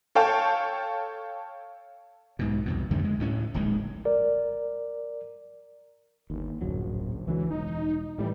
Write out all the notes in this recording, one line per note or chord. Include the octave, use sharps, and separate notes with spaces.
A4 C#5 F5 G5 A5
B1 G#2 B2
C2 F2 B2
F2 D3 D#3 A3
G#3
D2 A2 C#4
D1 A#1 D#3 G#3
A#4 D5
G1 D#2
D1 A#1 F#2 F#3
C#2 D3 E3 F#3
E1 D#4
A2 C3 E3 G3